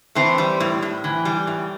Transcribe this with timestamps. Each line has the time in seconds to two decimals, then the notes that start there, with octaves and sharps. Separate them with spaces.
0.15 E3 A3 C4
0.38 G3
0.60 A2
0.82 A2
1.04 E3
1.25 G3
1.47 A2